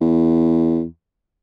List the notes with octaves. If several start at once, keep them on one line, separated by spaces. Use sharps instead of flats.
E2